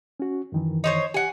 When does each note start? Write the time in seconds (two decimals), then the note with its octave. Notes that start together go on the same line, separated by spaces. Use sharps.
0.20 C#4 F#4
0.52 F#2 D#3 E3
0.84 D#4 C5 C#5
1.14 G4 F#5 G#5